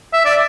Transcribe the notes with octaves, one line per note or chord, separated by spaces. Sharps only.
E5
D5